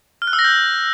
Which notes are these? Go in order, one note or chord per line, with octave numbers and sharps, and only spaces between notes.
F6
F#6
E6
A#6
G6